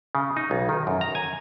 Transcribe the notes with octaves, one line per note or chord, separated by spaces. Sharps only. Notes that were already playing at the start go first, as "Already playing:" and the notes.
C#3
D#4
B1
D#3
F#2
A#5
G#5